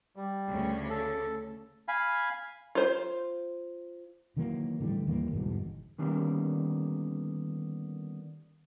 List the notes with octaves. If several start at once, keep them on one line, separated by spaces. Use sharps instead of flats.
G3
D2 C#3 C#4
A4
F5 G#5 B5
F4 C5
D#3 E3 F#3 A#3
A2 D3 E3 G3
D#2 E3 G3 A#3
G1 E2 G#2 B2
D3 D#3 G3 A#3 B3 C#4